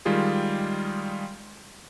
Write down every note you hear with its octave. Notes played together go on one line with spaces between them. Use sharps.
D#3 G3 G#3 F4 G4 G#4